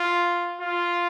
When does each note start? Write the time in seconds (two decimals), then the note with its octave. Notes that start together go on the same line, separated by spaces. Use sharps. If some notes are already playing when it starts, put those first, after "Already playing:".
Already playing: F4
0.61 F4